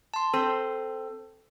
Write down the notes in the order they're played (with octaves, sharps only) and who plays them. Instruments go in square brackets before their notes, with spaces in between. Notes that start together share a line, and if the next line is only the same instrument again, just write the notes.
[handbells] A5 C6
[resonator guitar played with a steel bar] C4 [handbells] A4